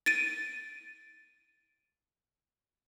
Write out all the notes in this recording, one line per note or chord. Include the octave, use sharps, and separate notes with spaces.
A6 D7 D#7